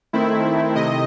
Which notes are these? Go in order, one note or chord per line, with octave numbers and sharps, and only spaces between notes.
D#3 A3 C4 E4
C3 D#5